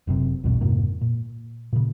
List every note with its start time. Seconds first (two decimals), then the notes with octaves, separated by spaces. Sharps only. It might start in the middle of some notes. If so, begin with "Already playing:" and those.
0.07 F#1 F#2 C3
0.44 A#1 E2 G2 B2
0.61 F2 G#2 C3 A#3
1.01 A#2
1.73 A#2 C#3